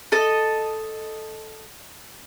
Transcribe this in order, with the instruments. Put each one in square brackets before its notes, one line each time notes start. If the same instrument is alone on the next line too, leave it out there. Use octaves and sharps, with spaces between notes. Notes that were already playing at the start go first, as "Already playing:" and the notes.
[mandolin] A4 D#5